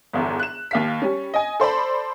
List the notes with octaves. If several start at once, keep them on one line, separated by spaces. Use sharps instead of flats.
G1 E2
F#6 E7
D#2 F5 B6
G3 C#4
D#5 G#5
A4 C5 D5 B5